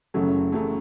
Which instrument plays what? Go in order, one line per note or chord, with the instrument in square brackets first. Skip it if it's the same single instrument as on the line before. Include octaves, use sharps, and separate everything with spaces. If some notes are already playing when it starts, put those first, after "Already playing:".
[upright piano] F#1 F#2 C#3 F#3 A3
F#2 C#3 F#3 A3